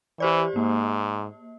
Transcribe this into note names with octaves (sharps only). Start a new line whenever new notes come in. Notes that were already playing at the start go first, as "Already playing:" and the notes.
E3 G4 C5 D5
G#2 A#3